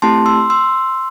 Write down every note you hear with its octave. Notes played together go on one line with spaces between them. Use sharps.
A3 C4 E4 G4 A5 C6
C6 E6
C6 E6